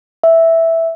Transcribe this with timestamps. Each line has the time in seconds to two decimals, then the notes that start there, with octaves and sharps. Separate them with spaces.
0.23 E5